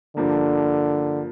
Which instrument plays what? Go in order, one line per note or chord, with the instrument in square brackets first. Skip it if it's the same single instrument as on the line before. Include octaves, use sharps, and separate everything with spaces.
[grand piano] G2 F3 A#3 [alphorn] D3